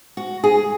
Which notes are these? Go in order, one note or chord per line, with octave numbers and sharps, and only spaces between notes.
F#4
G#4